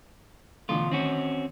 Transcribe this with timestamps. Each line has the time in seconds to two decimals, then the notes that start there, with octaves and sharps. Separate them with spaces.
0.69 D2 B2 D3 E3 A3 F4
0.91 D#3 C4 C#4 F#4